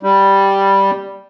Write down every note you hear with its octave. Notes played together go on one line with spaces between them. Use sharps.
G3